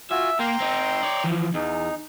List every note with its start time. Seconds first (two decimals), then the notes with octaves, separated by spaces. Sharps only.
0.11 F4 F#4 E5 G#5
0.39 A#3 G5 A#5 C6
0.60 C4 D#4
1.03 C#5 D5
1.24 E3 F3
1.54 E2 D#4